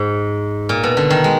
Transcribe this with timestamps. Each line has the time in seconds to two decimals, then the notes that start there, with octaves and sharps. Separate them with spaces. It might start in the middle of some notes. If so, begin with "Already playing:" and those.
Already playing: G#2
0.69 A#2
0.83 B2
0.97 D3
1.10 D#3
1.24 G#3